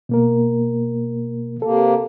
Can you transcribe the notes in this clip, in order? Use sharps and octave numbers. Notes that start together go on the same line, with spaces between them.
B2 A#3 A#4
C3 A#3 A4